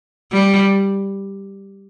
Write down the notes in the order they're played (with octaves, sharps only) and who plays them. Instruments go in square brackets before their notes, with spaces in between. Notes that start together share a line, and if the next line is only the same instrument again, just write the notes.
[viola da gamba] G3